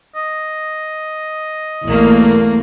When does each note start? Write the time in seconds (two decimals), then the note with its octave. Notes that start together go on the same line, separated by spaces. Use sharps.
0.15 D#5
1.84 B1 E2 A3 A#3